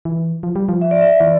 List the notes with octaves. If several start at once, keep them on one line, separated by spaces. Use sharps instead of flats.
E3
F3
G3
F3
E5
D5
E5
E3 D5